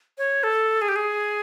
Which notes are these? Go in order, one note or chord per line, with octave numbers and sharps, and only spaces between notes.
C#5
A4
G#4
G4
G#4